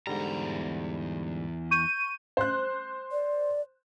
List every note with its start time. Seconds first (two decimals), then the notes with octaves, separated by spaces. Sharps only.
0.07 E2 G#2 D3 G3 A#5
1.71 C#6 G6 D#7
2.37 C5 F#6
3.12 D5